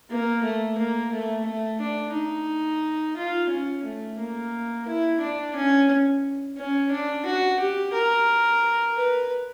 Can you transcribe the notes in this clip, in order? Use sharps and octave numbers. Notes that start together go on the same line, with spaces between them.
A#3
A3
A#3
A3
A3
D4
D#4
F4
C#4
A3
A#3
E4
D4
C#4
C#4
D4
F#4
G4
A#4
B4